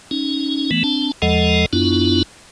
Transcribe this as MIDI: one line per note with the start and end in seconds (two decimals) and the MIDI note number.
0.11 0.70 61
0.11 0.70 63
0.71 0.83 52
0.71 0.83 57
0.71 0.83 59
0.84 1.12 60
0.84 1.12 62
0.84 1.12 81
1.22 1.66 40
1.22 1.66 53
1.22 1.66 56
1.22 1.66 69
1.22 1.66 75
1.22 1.66 78
1.73 2.23 42
1.73 2.23 59
1.73 2.23 62
1.73 2.23 64
1.73 2.23 65